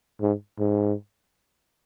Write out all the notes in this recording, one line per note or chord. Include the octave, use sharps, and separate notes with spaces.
G#2
G#2